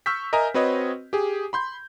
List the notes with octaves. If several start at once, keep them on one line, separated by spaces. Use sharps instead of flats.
C#6 E6 F6 G6 B6
A#4 D#5 E5 G#5 A#5
C4 F#4 B4 C#5 D#5
G4 G#4
B5 C6 G6